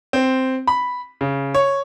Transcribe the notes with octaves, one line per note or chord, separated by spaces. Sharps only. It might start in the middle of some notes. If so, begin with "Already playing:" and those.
C4
B5
C#3
C#5